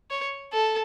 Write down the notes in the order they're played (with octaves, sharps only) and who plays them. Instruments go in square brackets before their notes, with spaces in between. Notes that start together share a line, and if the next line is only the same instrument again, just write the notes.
[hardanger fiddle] C#5
A4